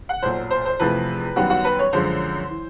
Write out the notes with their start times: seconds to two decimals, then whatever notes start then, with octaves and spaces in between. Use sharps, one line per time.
0.09 F#5
0.22 B1 A#2 F#3 C5
0.51 C5
0.65 C5
0.80 E2 C3 F3 A3 B4
1.36 F#2 D#3 G3 B3 F#4
1.50 F#4
1.65 B4
1.79 C#5
1.93 F#2 D3 F3 G#3 C5
2.49 E3